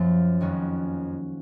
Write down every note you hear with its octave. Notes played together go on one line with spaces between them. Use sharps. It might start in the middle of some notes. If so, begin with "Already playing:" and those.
Already playing: F#2 F3 A#3 F4
F2 D#3 G#3 C#4 F#4